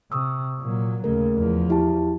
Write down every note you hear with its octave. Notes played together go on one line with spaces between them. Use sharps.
C3 C#6 D#6 E6
A#2 F#3
D#2 C#3 A3 A#4
E2 F3
E4 G4 A5